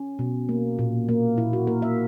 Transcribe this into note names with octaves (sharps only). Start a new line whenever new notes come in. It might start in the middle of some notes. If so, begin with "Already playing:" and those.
Already playing: C#4
B2
A#3
A#2
A#3
A#2 E4
F#4
A#3 A#4
E5